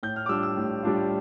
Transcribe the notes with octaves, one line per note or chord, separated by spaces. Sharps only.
A2 G6
F6
D6
G3 D4 F4 E6
E6
A2
G3 D4 F4